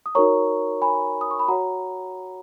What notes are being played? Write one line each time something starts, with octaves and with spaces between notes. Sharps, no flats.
D#6
D#4 F#4 A#4 C#5 A#5 C#6
G#5 B5
D#6
C#6
B5
F#4 C#5 F#5 A#5